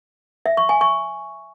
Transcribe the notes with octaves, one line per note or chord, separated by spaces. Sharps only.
E5
C#6
G#5
C#6